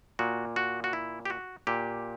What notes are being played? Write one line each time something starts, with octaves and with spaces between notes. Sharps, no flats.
A#2 F#4
F#4
F#4
E4
G4
F#4
A#2 G4